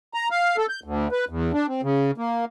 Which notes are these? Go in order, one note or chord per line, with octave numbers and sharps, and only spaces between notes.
A#5
F5
A4
G6
D2
B4
E2
D4
C4
C#3
A#3